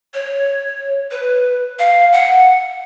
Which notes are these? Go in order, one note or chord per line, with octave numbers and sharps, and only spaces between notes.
C#5
B4
F5
F#5